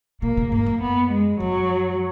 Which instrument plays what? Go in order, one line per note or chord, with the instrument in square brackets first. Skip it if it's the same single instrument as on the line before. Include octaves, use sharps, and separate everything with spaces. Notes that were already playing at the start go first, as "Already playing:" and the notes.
[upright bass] B2 [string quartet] A#3
[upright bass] C#3
[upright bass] G#2 [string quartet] A#3
[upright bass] F#2
[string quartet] B3
G#3
[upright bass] F#2 [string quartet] F#3